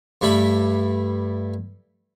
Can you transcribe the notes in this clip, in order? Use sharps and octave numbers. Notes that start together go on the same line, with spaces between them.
G2 G3 A3 E4 B5